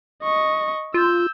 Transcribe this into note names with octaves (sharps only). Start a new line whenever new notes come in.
D#5 C#6
F4 E6 G6